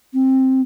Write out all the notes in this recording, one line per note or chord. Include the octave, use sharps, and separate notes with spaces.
C4